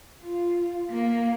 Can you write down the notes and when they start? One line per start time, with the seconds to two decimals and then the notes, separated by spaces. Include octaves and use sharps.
0.22 F4
0.91 A#3